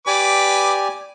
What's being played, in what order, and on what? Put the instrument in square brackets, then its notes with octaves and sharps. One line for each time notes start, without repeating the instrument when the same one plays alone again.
[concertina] G4 D5 G#5 [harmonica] B4 D6